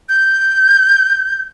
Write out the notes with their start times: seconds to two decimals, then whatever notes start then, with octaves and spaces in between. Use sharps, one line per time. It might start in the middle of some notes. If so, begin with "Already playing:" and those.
0.09 G6